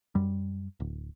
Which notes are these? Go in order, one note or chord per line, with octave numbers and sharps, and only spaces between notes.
F#2 G3
D1